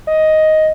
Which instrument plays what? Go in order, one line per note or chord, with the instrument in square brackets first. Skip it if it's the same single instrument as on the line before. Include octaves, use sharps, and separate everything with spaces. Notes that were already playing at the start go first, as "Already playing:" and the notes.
[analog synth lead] D#5